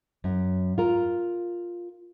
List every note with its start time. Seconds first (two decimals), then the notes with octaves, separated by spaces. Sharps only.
0.24 F#2
0.78 F4 A#4